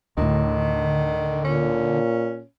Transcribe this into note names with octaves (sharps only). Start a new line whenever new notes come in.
D2 A2 D3 D#3
A#2 C#4